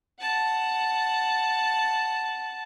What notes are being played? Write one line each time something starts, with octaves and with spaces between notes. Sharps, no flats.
F#5 A5